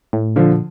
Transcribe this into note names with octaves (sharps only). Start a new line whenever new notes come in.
A2
A#2 D3 F3